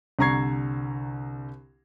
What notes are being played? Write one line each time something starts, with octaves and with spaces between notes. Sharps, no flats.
C2 D3 A#5 C#6 G#6 C7